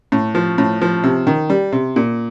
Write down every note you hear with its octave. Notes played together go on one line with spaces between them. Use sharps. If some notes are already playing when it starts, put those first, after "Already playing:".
A2
F3
A2
F3
C3
D#3
G3
C3
A#2